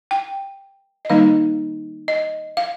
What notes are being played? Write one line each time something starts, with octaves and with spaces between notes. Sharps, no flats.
G5
D#5
D#3 G3 A#3 D#4 F5
D#5
F5